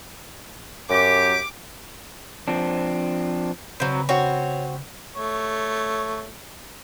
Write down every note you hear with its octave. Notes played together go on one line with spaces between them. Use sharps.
F#2 G4 D6
F3 C4 D4
C#3 F#3 C4 B4
C4 F#4 C#5
A3 C#5